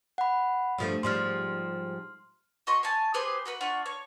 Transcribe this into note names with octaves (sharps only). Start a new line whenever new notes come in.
F#5 B5
G2 F3 A3
G#2 F3 G3 C6 F6
F#4 D#5 C6 C#6
C#5 G#5 A5
G4 G#4 B4 C5
F#4 A4 B4 F#5
D4 F4 F#5 C#6
C#5